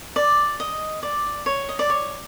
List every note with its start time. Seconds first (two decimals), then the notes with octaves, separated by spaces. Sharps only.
0.16 D5
0.60 D#5
1.03 D5
1.46 C#5
1.69 D#5
1.79 D5
1.90 C#5